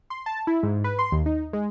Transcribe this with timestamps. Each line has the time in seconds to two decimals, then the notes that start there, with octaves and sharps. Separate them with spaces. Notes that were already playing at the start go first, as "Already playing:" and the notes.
0.10 C6
0.26 A5
0.47 E4
0.63 G#2
0.84 B4
0.99 C6
1.12 D#2
1.26 D#4
1.53 G#3